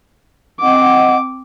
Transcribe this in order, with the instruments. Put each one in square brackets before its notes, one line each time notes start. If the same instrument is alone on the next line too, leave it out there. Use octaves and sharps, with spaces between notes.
[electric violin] C4 D6 [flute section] D#5 F#5